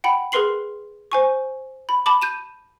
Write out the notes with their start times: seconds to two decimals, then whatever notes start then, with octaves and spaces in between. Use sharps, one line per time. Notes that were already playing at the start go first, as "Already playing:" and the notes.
0.04 F#5 G5 B5
0.32 G#4 A#4 B4 C6 C7 F#7
1.12 C5 G#5 C#6
1.89 B5
2.06 A5 B5 D6
2.22 G6 D#7 E7